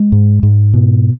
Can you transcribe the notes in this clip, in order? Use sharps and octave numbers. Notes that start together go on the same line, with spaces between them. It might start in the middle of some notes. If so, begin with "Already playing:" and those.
Already playing: G#3
G#2
G#2
B2